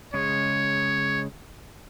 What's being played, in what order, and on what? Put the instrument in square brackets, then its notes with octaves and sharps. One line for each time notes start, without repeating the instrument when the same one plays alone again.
[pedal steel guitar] C#3 G#3 [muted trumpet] C#5